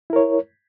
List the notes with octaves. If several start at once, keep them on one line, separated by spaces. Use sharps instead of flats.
E4 A#4 C#5